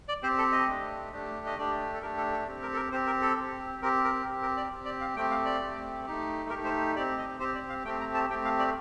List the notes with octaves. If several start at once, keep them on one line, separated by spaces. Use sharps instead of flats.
D5
C4 G4 C5
A4
D#5
A3 D4 G4
A3 D4 G4
D#5
A3 D4 G4 D5
A4
A3 D4 G4 A#4
A4
A4
C4 G4
A#4
A4
A#4
C4 G4 C5
A#4
A4
C4 G4
C4 G4 A#4
A#4
C4 G4
A#4
D5
C4 G4
D5
F5
A3 C4 G4 G5
F5
D5
A3 C4 G4
A3 D#4 G4
A3 D#4 G4 A#4
C5
C4 G4 D5
D#5
C4 G4 C5
D5
F5
A3 C4 G4 G5
A#5
A5
A3 C4 G4 G5
F5
D5